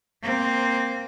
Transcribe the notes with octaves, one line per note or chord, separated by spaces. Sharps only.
A#3 C4